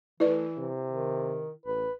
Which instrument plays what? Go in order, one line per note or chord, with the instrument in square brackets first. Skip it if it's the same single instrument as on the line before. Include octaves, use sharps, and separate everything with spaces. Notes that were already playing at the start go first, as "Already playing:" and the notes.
[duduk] E3 [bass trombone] A3 [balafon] E4 B4 D5
[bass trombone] C3
[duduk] D#3
[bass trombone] A1 [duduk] B4